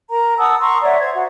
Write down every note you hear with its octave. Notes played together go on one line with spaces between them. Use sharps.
A#4 A#5
F#5 A5 D#6 E6
A#5 C6 C#6
C#5 D5 E5 F#5
C5 G#6
F#4